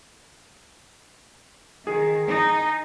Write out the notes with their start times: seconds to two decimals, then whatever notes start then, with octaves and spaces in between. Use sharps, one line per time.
1.87 D#3 G#4
2.27 D#4